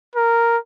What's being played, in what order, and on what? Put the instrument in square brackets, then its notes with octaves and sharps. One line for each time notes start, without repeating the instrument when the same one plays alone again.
[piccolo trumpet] A#4